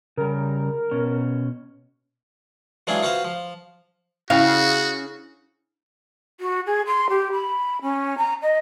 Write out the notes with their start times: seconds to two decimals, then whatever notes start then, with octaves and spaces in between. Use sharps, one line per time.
0.17 C#3 G3 A#4
0.91 B2 C#4
2.87 E3 F#3 G#3 D4 F4 G#4
3.03 F4 F#4 B4 C5 F5
3.25 F3
4.30 C#3 C#4 E4 F#4 F5 G5
6.39 F#4
6.66 G#4
6.87 C6
7.09 G4
7.32 B5
7.81 C#4
8.17 A#5
8.42 D#5